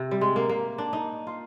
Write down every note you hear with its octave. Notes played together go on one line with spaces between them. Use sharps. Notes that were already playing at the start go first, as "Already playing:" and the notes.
Already playing: C3
G3
G#3
A#3
A#3
D4
D#4
F4